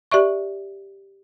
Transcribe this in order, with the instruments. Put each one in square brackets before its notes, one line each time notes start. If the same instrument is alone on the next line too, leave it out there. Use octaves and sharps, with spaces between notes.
[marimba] G4 D5 E5 C#6